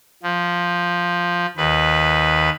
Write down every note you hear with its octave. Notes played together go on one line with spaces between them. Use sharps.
F3
D#2 B4